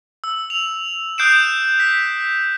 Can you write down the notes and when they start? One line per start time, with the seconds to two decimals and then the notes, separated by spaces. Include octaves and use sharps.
0.24 E6
0.50 F7
1.18 D#6 F#6 G6 C7 D7 E7
1.80 B6